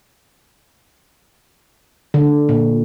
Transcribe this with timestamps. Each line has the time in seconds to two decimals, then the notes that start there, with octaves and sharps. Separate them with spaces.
2.14 D3
2.49 A#2